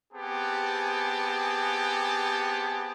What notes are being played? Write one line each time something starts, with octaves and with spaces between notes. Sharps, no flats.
B3 C4 G4 G#4 F#5 A5